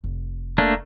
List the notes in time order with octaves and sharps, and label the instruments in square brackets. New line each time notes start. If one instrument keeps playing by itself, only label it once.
[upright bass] F1
[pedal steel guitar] A3 A#3 D4